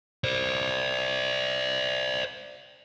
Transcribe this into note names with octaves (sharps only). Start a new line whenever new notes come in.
C5 D5